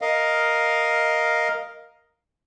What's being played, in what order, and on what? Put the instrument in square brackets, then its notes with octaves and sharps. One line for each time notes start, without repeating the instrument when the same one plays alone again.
[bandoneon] A#4 D#5 F5